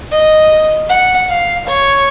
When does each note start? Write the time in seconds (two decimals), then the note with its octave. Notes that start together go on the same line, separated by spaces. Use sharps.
0.12 D#5
0.89 F#5
1.29 F5
1.67 C#5